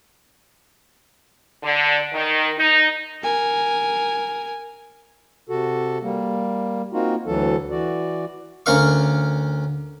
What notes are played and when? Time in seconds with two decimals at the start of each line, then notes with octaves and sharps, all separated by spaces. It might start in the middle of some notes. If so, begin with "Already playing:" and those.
1.63 D3
2.13 D#3
2.58 D#4
3.23 A#4 G#5
5.49 C3 F#4 A4
6.03 G3 A#3
6.93 A#3 C4 D#4 F4 F#4
7.27 D2 E3 F#3 A4
7.71 E3 F#4 D5
8.66 D2 C#4 A#4 F5 C#6